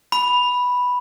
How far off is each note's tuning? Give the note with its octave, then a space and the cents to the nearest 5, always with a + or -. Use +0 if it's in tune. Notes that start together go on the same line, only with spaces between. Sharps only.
B5 -5